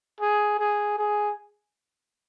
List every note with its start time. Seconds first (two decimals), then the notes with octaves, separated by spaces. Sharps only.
0.21 G#4
0.59 G#4
0.99 G#4